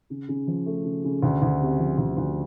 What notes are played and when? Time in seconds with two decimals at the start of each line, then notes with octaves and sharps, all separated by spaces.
0.10 C#3
0.29 C#3
0.47 F3
0.66 A3
0.85 C#3
1.04 C#3
1.23 D2
1.42 D2
1.61 C3
1.79 F3
1.98 D2
2.17 D2